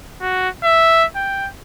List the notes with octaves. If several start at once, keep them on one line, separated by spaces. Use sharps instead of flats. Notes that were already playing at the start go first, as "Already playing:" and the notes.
F#4
E5
G5